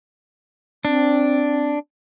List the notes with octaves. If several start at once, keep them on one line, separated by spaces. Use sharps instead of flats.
C4 D4